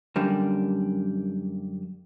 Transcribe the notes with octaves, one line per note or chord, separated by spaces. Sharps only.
F#2 D3 G3 A#3 D4